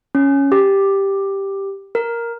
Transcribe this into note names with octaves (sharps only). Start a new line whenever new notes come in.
C#4
G4
A#4